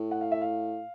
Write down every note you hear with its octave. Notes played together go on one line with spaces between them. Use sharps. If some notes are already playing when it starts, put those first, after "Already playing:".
Already playing: A2
F#5
F5
E5
F5